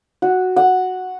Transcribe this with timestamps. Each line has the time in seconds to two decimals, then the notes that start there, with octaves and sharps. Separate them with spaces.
0.22 F#4
0.56 F#5